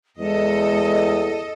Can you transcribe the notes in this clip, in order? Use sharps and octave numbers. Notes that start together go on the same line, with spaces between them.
E2 G#3 A4 D#5